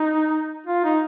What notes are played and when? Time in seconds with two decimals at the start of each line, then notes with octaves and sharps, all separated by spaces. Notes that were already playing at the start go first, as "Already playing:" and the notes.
Already playing: D#4
0.66 F4
0.84 D#4